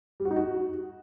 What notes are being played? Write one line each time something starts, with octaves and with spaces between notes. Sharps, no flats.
G3
F#4
D#4
F#4